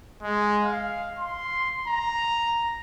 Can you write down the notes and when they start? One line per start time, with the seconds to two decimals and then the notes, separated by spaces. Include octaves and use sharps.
0.23 G#3
0.64 F5
1.18 C6
1.87 A#5